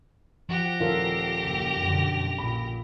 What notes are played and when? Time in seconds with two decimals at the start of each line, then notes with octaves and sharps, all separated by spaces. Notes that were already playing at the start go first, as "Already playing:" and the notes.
0.49 F3 G4 F#5 A#6
0.80 D#1 F4 A4 A#4 F5
1.44 F#1
1.83 F#2 B2 D3
2.38 A#1 A#2 B5